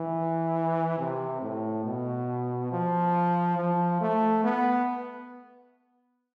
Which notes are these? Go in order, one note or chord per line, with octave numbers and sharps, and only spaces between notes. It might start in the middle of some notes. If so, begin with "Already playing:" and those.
Already playing: E3
C3
A2
B2
F3
F3
A3
B3